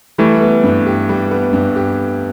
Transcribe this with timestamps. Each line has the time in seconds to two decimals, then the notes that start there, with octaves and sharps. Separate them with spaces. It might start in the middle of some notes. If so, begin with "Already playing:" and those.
0.18 E3 G3 A3
0.41 B3
0.64 G2
0.86 G4
1.09 G3
1.31 B3
1.53 G2
1.76 G4